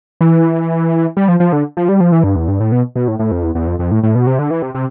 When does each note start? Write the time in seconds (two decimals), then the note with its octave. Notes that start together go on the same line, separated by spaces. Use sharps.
0.21 E3
1.17 G3
1.28 F3
1.40 F3
1.53 D3
1.77 F3
1.89 G3
2.00 F3
2.12 E3
2.24 G2
2.36 E2
2.48 G2
2.60 A2
2.72 B2
2.96 B2
3.08 A2
3.19 A2
3.31 F2
3.43 E2
3.55 E2
3.67 F2
3.79 F2
3.91 A2
4.03 A2
4.15 B2
4.27 C3
4.39 D3
4.50 E3
4.62 C3
4.75 C3